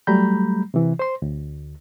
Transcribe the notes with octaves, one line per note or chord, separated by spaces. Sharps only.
F#3 G3 A3 A#5 B5 G6
C3 E3
C5 C6
D2